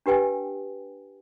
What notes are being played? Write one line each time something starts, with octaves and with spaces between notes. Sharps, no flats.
D4 G4 B4 G5 G#5